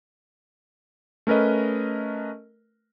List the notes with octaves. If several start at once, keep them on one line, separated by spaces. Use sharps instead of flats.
A3 C#4 A#4 B4 D#5